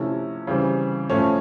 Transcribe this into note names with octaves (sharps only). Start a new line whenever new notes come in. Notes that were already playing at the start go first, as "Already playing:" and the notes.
Already playing: C3 F3 A3 C#4 E4
C#3 E3 G3 C4
A2 F3 A3 C#4